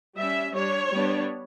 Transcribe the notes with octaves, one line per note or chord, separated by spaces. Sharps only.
G3 C#4 E5
G3 D4 C#5
G3 B3 D4